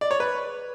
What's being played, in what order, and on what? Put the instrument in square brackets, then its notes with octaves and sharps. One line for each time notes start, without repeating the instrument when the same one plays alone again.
[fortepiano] D5
C#5
B4